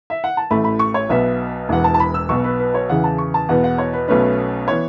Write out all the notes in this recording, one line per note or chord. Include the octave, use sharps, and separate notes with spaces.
E5
F#5
A5
A1 A2 A3 B5
B5
C#6
C#5
B1 B2 B3 E5
E1 E2 E3 B3 F#5
A5
A5
B5
E6
B1 B2 B3 C#6
B4
B4
C#5
E2 C#3 E3 F#5
A5
C#6
A5
E2 B2 B3 F#5
F#5
C#5
B4
B1 B2 A3 C#4 B4
E3 B3 C#5